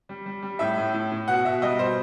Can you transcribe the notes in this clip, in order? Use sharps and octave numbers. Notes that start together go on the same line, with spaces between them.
G3
G3
G3
A2 E5
A2
A2
A2
B2 F#5
B2 E5
G3 D#5
B2 C5